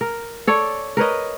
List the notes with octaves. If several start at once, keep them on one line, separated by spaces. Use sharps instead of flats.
A#4
A4 C#5 D5
A#4 B4 C#5 D#5